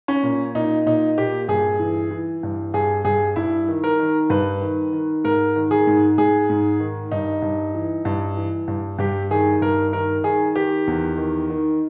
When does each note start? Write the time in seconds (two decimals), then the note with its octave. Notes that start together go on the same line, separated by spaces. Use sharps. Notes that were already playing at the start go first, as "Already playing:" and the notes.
0.08 C#4
0.23 A#2
0.55 A#2 D#4
0.86 A#2 D#4
1.18 A#2 G4
1.48 G2 G#4
1.80 E3
2.11 E3
2.43 G2
2.74 G2 G#4
3.05 G2 G#4
3.36 G2 E4
3.68 D#3
3.84 A#4
3.99 D#3
4.30 G2 B4
4.61 D#3
4.93 D#3
5.24 G#2 A#4
5.56 D#3
5.71 G#4
5.87 G#2
6.18 G#2 G#4
6.50 G#2
6.80 D#3
7.12 G2 D#4
7.42 G2
7.75 E3
8.05 G2
8.37 E3
8.68 G2
8.99 G2 G4
9.31 D#3 G#4
9.62 G2 A#4
9.92 D#3 A#4
10.24 D#3 G#4
10.56 D#3 G4
10.87 E2
11.17 D#3
11.50 D#3